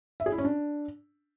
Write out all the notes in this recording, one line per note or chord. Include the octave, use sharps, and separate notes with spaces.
E5
G#4
E4
C#4
D4